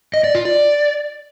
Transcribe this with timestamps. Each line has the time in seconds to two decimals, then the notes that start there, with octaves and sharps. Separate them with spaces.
0.14 D#5
0.24 D5
0.35 F4
0.45 D5